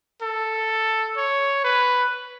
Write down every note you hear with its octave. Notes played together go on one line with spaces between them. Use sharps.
A4
C#5
B4